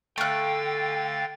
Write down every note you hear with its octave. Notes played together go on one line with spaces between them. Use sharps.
D3 A3 F5 G5 F#6 A6